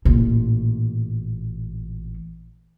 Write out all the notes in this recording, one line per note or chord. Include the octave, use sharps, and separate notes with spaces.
A1 A#2